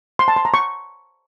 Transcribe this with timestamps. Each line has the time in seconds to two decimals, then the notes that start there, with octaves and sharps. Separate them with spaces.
0.19 C6
0.28 A5
0.36 C6
0.45 A#5
0.54 C#6